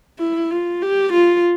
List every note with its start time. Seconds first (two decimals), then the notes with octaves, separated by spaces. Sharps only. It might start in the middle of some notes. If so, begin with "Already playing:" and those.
0.19 E4
0.51 F4
0.82 G4
1.13 F4